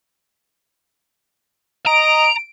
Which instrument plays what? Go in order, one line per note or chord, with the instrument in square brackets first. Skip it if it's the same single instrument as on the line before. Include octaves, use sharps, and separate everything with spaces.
[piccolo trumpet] D#5 [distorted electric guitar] A#5 [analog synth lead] D7